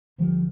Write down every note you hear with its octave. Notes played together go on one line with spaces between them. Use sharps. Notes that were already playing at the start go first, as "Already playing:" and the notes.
D2 D3 F3 G3